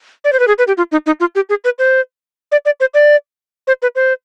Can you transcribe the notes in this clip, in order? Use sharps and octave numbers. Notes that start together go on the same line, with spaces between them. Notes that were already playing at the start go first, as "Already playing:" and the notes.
D5
C5
B4
G#4
B4
G4
F4
D#4
D#4
F4
G4
G#4
B4
C5
D5
D5
C5
D5
C5
B4
C5